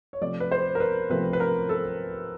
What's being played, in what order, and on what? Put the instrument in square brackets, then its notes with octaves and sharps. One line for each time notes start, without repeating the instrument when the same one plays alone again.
[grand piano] C#5
C3 F3 A3 D5
B4
C5
A#4
B4
C3 F3 A3 B4
B4
A#4
A4